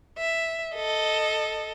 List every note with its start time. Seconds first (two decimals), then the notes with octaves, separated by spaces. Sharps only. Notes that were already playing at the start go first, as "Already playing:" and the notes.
0.18 E5
0.75 A4 D#5